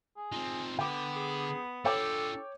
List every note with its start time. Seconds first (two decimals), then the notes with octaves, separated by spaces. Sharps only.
0.17 G#4
0.32 C4 D#4 F4
0.79 D3 B3 G5 D6
1.16 G#4
1.85 D4 F4 A4 C#5 G5 D6